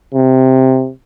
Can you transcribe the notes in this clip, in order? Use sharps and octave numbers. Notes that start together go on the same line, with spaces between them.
C3